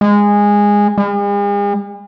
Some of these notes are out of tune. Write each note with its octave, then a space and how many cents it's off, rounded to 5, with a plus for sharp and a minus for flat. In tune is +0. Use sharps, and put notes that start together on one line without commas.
G#3 -15
G#3 -45